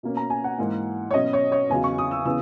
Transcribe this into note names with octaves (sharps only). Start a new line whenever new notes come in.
B2 A#3 C#4
A#5
G#5
F#5
G#2 E3 A#3
C#5
B2 F#3 C#4 D#5
C#5
C#5
E2 C#3 F#3 G#5
C#6
D#6
E6
C#3 E3 B3 E6